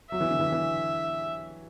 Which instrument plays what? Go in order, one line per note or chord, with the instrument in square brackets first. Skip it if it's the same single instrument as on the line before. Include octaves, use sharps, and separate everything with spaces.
[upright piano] F#3 [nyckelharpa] E5
[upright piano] E3
D3
E3
E3